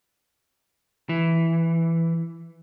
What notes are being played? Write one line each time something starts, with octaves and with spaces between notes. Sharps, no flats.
E3